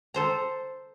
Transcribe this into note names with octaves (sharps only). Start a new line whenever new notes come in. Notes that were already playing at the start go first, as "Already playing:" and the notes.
A4 C5 A#5